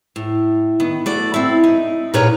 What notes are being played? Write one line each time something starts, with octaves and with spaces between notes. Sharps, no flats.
A2
D#3 B3
A3 F#4 D5
C4 E4
D#4
A#2 D#4 A#4 B4 C#5 F#5